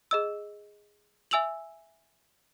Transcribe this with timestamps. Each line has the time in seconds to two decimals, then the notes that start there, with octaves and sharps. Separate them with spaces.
0.11 G#4 D#5 E6
1.31 E5 G#5 E6 F7 F#7